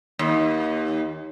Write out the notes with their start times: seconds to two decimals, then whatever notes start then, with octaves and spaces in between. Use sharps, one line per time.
0.19 D#2